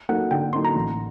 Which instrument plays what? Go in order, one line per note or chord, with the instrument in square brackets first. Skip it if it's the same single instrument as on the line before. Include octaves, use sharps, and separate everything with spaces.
[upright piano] F#3 A#3 D#4 A4 [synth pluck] F#5
[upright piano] D3 [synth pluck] G5
[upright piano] F#3 A#3 D#4 A4 [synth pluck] C6
[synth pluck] A#5
[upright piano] A1